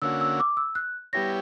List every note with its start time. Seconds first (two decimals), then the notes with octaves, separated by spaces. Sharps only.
0.02 D3 A#3 C#4 F#4 E6
0.21 E6
0.40 D6
0.57 E6
0.75 F#6
1.13 G3 B3 E4 G4 C#5 A#6